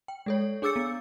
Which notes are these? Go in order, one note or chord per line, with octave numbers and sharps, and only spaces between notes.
G5
G#3 A4 C#5
D4 G#4 D6 E6 A6 C#7
B3